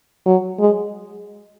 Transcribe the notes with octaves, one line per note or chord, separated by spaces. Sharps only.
F#3
G#3